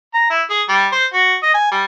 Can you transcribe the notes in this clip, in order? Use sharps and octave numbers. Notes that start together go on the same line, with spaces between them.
A#5
E4
G#4
G3
C5
F#4
D#5
G#5
G3